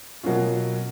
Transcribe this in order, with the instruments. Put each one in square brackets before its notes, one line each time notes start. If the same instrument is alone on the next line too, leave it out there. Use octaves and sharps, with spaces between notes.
[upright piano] B2 F#3 A#3 C#4 F4